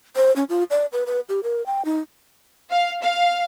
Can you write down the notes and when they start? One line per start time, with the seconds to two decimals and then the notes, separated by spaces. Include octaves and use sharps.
0.16 C5
0.36 C#4
0.49 F4
0.71 D5
0.93 B4
1.06 B4
1.29 G4
1.43 A#4
1.66 G5
1.85 D#4
2.70 F5
3.02 F5